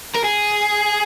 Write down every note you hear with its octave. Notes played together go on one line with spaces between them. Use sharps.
A#4
G#4